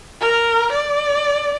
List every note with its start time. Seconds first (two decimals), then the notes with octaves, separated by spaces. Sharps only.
0.21 A#4
0.72 D5